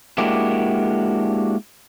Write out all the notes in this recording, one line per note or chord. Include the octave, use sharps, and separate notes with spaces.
G#3 A#3 D4 E4 F#4 G4